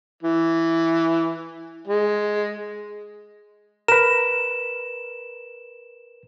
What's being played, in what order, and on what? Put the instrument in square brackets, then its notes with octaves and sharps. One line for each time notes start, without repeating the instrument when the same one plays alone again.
[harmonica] E3
G#3
[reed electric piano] A#4 B4 [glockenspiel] E7